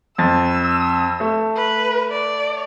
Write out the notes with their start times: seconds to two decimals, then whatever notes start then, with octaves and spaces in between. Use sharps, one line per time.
0.18 F2 E6 A6
1.20 A3
1.56 B4
2.11 D5